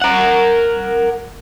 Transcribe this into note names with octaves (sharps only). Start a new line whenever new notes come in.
A#4 F#5